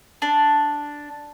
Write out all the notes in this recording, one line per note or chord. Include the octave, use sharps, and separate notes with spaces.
D4